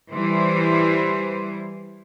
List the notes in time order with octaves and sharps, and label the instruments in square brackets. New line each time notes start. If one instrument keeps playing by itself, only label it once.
[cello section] E3 G3 C5